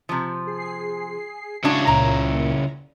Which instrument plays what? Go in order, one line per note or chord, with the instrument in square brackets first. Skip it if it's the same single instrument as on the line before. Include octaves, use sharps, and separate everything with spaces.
[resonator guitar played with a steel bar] C3 F3
[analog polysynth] G#4 C7
[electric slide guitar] C#3 E4 C#5 [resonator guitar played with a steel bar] G#3 D4 F#4
[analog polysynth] C#2 A#2 [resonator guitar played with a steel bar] A#5